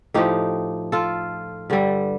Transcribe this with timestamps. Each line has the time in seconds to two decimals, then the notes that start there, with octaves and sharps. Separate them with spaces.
0.14 A2 F3 D#4 G4
0.92 F4 A4
1.70 G2 D3 G3